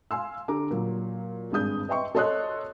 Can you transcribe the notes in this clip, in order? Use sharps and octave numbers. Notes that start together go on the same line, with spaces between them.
F5 G#5 C6 E6
D3 G4 A4 A#5 D6
A#2 F#3
G#1 G2 G#4 D#6 G6
B4 D#5 E5 G5 C6 C#6
A4 C#5 D#5 C6 D#6 F#6